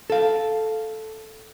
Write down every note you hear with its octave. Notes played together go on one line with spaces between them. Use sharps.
A4 F5